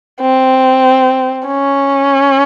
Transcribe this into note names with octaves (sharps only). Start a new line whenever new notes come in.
C4
C#4